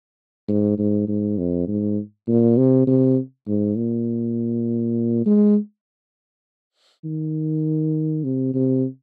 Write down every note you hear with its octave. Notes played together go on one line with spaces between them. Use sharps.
G#2
G#2
G#2
F2
G#2
A#2
C3
C3
G#2
A#2
G#3
D#3
C3
C3